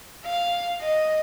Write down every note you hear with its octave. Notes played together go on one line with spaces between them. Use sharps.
F5
D#5